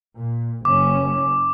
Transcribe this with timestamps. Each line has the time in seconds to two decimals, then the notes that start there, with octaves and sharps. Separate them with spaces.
0.16 A#2
0.65 F#1 C#4 D6